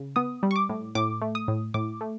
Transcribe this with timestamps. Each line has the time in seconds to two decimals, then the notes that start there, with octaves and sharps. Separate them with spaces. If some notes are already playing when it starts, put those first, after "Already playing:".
Already playing: C#3
0.16 B3 D#6
0.43 G3
0.51 C#6
0.56 D6
0.69 A2
0.95 A2 D6
1.22 A3
1.35 D#6
1.48 A2
1.74 A2 D6
2.01 A3